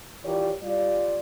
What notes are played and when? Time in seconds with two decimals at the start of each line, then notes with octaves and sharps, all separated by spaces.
0.24 E3 F4 G4 A#4 C#5 D5
0.62 G3 F4 D5